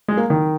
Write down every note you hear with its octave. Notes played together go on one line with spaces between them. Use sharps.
G#3
A#3
D#3